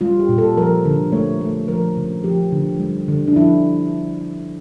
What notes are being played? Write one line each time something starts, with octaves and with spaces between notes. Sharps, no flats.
G3 F4
G4
A#2
A4
F3 A#4
D3
A3 C#5
A3
F3 A#4
C#3
F3 G4
D3
G3
D3
D4
F3 E4